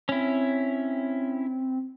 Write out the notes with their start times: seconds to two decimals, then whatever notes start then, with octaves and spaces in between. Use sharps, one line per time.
0.09 C4 C#4 E4